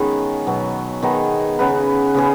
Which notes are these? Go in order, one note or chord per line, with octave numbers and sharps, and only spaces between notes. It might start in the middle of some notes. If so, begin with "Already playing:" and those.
Already playing: D#3 G#3 B3 C#4 D#4 G#4 B4
B2 F#3 B3
D#3 B3 D#4 G#4
C#3 B3 D#4 B4
C#3 B3 G#4